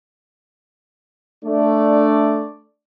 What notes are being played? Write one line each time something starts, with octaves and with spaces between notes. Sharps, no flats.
A3 D4 D5